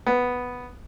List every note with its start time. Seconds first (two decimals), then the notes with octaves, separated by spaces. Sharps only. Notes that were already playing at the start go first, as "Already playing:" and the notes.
0.07 B3